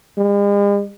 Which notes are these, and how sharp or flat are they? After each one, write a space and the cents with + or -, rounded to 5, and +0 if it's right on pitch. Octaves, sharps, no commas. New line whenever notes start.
G#3 -45